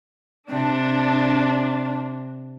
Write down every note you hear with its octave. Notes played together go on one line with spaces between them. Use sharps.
C3 D4